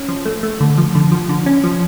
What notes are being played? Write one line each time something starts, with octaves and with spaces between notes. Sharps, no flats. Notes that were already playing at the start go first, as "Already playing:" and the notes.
Already playing: C#4
F3
A3
A3
D3
F3
D3
F3
D3
C#4
F3